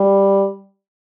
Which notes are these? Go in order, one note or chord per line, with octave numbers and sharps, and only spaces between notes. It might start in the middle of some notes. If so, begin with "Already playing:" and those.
Already playing: G3